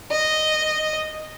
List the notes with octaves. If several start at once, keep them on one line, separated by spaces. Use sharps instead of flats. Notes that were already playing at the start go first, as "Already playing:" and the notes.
D#5